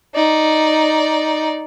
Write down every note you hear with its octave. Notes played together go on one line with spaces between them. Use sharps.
D#4 D5